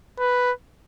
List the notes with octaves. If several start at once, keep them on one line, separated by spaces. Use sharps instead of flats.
B4